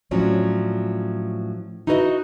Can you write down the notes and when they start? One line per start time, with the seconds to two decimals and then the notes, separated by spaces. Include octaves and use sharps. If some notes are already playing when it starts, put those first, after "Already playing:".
0.11 A2 F3 F#3 C#4 D4
1.87 D#4 E4 F#4 B4 C#5 D#5